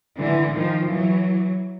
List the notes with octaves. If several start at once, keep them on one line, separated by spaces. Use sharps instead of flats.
D3 E3
D#3 F3
E3 F#3